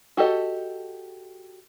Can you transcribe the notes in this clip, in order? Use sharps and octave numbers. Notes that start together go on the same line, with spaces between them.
F#4 G4 A4 D#5